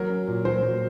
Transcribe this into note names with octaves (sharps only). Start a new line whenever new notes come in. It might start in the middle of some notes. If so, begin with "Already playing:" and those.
Already playing: F#3 A#4
C#4
A#2
F#3 C5
F#3